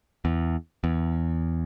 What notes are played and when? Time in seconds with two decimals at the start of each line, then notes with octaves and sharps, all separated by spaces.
0.25 E2
0.84 E2